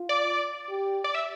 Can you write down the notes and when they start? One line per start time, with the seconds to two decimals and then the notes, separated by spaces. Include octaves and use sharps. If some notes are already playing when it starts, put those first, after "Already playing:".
Already playing: F4
0.09 D5
0.69 G4
1.04 D5
1.15 E5